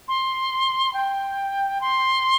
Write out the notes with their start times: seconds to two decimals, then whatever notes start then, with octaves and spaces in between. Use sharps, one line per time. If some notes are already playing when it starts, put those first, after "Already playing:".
0.08 C6
0.94 G5
1.81 C6